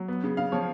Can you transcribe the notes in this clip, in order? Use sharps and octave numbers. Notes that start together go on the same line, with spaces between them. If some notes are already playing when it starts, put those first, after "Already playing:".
Already playing: F#3
B3
C#3
C#3 F5
F3 C#5